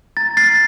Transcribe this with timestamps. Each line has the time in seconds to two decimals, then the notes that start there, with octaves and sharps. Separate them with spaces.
0.17 A#5 A6
0.37 F6 A6 C7